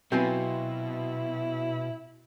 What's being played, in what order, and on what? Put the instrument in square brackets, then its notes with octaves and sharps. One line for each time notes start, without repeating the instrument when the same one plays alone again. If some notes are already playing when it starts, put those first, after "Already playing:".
[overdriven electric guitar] B2 [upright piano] F#3 B3 [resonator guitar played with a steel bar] C4 F4 G#5 [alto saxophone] E4